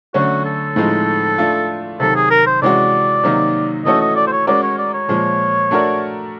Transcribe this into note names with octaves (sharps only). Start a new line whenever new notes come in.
D3 F#3 A3 C#4 F#4
A4
A2 F3 G#3 C4 D#4
A3 D4 F4
C3 D#3 F#3 A4
G#4
A#4
C5
C3 E3 G#3 C#4 F#4 D5
C3 D#3 F#3 A#3 D#4
E3 A3 C#4 F#4 A4 D#5
D#5
D5
C5
C#5
G#3 C#4 F#4 A#4 D5
C#5
D5
C#5
A#2 F3 G#3
A3 D4 F#4 A#4 D5